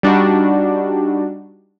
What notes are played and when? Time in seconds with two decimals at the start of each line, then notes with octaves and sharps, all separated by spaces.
0.03 G3 D4 D#4 F#4